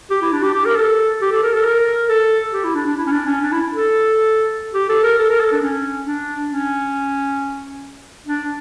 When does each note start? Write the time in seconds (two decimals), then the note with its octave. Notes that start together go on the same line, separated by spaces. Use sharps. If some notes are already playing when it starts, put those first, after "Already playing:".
0.11 G4
0.22 E4
0.33 D4
0.43 G4
0.54 G4
0.65 A#4
0.76 A4
1.21 G4
1.32 A4
1.43 A#4
1.54 A4
1.65 A#4
2.09 A4
2.53 G4
2.64 E4
2.75 D4
2.86 D4
2.98 E4
3.06 C#4
3.12 D4
3.26 C#4
3.41 D4
3.52 E4
3.75 A4
4.74 G4
4.89 A4
5.04 A#4
5.18 A4
5.30 A#4
5.40 A4
5.52 D4
5.62 C#4
6.06 D4
6.51 C#4
8.27 D4